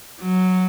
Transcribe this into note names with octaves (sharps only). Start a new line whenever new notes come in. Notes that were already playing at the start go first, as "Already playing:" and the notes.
F#3